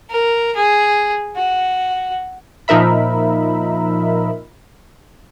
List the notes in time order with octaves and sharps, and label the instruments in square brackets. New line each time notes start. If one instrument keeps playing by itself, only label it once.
[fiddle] A#4
G#4
F#4
[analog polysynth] A#2 F3 D#4 A#4 E5 B5